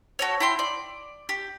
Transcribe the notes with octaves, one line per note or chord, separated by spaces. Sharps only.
F#4 A4 C#5
E4 G5 C6
D5
G4